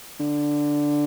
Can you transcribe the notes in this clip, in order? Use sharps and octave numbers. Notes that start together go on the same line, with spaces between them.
D3